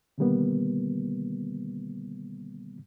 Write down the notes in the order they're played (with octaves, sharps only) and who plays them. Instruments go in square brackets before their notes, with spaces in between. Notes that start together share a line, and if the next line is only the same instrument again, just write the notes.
[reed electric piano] B2 D3 D#3 G3 A#3 B3